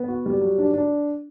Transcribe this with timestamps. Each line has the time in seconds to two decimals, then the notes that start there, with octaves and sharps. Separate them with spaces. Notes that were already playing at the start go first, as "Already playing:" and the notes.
Already playing: B3
0.08 F#4
0.26 G3
0.41 F#3
0.58 D4
0.74 D4